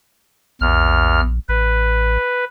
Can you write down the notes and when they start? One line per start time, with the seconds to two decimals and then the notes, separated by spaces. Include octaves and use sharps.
0.61 A#1 E2 F6
1.49 A1 B4